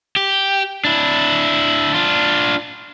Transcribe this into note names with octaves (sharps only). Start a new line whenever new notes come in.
G4
D4 E4
D4 F4